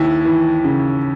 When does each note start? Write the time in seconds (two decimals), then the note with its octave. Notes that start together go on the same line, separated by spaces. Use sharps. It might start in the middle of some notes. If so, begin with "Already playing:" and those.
Already playing: D#2 E4
0.25 E3
0.64 C#3